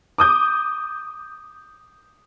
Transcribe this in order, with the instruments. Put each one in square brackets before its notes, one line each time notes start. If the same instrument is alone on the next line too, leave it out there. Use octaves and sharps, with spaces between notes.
[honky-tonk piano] D6 D#6 G6